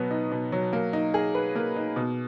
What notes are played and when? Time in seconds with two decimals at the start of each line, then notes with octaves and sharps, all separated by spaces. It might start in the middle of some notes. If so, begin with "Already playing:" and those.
Already playing: B2 F#3 B3
0.11 D#4
0.32 B2
0.52 F#3
0.73 A#3
0.93 D#4
1.14 G#4
1.35 B4
1.56 A#3
1.76 D#4
1.96 B2